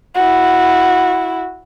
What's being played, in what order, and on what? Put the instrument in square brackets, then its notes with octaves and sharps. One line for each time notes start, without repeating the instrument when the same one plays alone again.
[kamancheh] E4 F#4